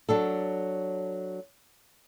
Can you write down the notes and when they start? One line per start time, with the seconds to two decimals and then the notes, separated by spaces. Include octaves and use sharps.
0.09 F#3 D4 A4